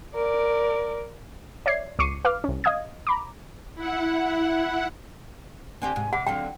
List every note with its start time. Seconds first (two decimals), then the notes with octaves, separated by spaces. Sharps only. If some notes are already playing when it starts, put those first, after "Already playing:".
0.15 A#4 D5
1.66 C#5 D5 E5 G#6 C7
1.99 C#2 C#6 D6 C7 C#7 D#7
2.25 B4 F5 D6 F6
2.44 C2 C#4
2.64 D#5 F5 D#6 G#6
3.07 A#5 B5 D6
3.75 E4 F#5
5.82 D3 C4 G4 G#5
5.96 G#2 C3
6.13 C3 F#5 D6
6.27 D3 F#3 C4 F5 G5